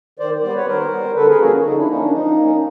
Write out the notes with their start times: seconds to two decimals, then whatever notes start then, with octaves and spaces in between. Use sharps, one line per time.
0.19 D#3 C5 D5
0.43 G3 B3 C5 D5
0.55 B4 C#5
0.67 D#3 A#4 C5
0.92 G3 B3
1.16 D3 A4 B4
1.28 G#4 A#4
1.40 F3 A#3 C#4 F#4 G#4
1.64 D3 D#4
1.76 D4 E4
1.89 F3 A#3 C#4 D#4
2.01 D4
2.13 F3 D#4
2.37 A#3
2.42 C#4